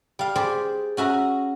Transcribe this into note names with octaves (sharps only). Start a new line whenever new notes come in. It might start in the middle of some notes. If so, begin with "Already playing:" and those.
G3 F5
G4 G#4 C5 D5
C#4 F#4 E5 A#5